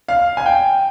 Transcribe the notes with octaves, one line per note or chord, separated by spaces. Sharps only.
F5
G#5
G5